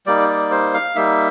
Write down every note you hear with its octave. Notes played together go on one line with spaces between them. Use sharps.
G3 A#3 D#4 D5
D5
C5
F5
G3 A#3 D#4 E5